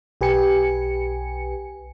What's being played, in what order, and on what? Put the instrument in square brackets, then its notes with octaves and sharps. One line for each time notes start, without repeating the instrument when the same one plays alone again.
[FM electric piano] B1 G4 B4 G#5 C#7